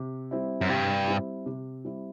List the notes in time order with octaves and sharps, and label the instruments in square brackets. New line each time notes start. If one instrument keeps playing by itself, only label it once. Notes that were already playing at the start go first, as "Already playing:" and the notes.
Already playing: [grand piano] C3
G3 C4 E4
[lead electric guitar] F#2
[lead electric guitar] G2 [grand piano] C3
[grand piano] G3 C4 E4
C3
G3 C4 E4